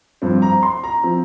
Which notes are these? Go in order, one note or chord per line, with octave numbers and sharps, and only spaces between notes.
G2 F3 C4
A#5
C6
A#5
F3 C4